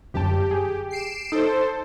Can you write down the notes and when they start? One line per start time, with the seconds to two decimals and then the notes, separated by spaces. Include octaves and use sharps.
0.14 G1 F#2 G4 A5
0.51 G#4
0.90 C7 D7 E7
1.32 D#4 A4 C5